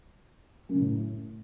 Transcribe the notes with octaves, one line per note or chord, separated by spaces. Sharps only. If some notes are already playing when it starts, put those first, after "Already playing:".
F#2
C#3
A2